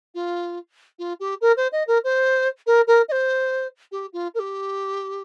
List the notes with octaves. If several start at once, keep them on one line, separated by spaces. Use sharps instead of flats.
F4
F4
G4
A#4
C5
D#5
A#4
C5
A#4
A#4
D#5
C5
G4
F4
A#4
G4